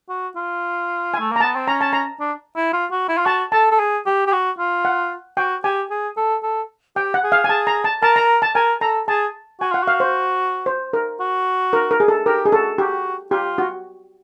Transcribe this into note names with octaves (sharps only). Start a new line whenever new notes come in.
F#4
F4
G#5
A3
A#3 A#5
B3 A5
C4
C#4 A#5
A5
A#5
D4
E4
F4
F#4
E4
F4
F#4 A5
A4 A5
A4
G#4
G4
G4
F#4
F4
F#5
F#4 G5
G4 G#5
G#4
A4
A4
G4 G5
F#5
G#4
F5
G#5
G#4 A5
A#5
A5
A#4 A5
A#5
A5
A#4 G#5
A4 A#5
G#4 A5
F#4 G#5
F4 F#5
F#4 F5
C5
C5
A#4
F#4
A#4
A#4
G#4
A4
G4 A#4
G#4
F#4 A4
F#4 G4
F4 G4
F#4